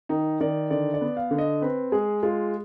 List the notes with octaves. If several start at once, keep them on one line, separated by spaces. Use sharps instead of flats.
D#3 D#4
D#3 D5
D3 D5
D5
B3
F5
D3
D#5
C4 B4
G#3 G#4
G#3 F4